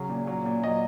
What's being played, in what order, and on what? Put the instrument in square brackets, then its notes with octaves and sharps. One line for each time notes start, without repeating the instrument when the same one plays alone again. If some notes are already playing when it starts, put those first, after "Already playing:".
Already playing: [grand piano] C#3 F#3
A#2
F#3
A#2
F#3 D#5